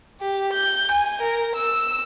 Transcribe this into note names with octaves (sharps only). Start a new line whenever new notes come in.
G4
G6
G#5
A#4
E6